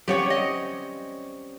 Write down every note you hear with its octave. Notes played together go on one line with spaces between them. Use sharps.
G3 C4 C#4 G4 C#5 F#5
D#5